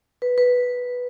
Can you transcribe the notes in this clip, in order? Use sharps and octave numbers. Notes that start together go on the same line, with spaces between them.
B4
B4